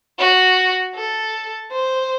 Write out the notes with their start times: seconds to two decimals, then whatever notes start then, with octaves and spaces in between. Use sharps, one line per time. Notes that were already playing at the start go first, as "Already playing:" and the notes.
0.19 F#4
0.96 A4
1.72 C5